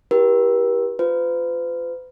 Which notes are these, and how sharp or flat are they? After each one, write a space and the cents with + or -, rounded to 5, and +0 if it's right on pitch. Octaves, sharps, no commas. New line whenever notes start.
E4 +0 G4 +0 A#4 +45
F4 +0 B4 +45